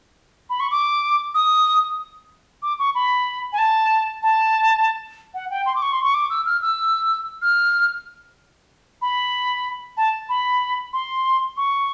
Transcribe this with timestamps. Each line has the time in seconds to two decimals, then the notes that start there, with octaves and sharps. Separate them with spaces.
0.50 B5
0.60 C#6
0.71 D6
1.35 D#6
2.62 D6
2.79 C#6
2.95 B5
3.53 G#5
3.58 A5
4.23 A5
5.34 F#5
5.50 G5
5.66 C6
5.76 D6
5.82 C#6
5.93 C6
6.03 C#6
6.14 D6
6.30 E6
6.46 F6
6.62 E6
7.42 F6
9.02 B5
9.97 A5
10.29 B5
10.93 C6
11.57 C#6